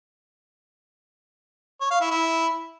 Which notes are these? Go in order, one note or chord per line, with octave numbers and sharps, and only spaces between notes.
C#5
F5
E4
E4